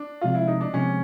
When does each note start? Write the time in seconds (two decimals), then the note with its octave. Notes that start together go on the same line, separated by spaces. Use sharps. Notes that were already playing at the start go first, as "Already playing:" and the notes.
Already playing: D4
0.21 C3 F3 G#3 C4 F4
0.35 E4
0.47 D#4
0.61 D4
0.74 C3 F3 G#3 C4 C#4